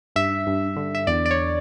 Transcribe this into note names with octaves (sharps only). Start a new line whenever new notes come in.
G2 E5
G2
D3
E5
E2 D5
D5
C#5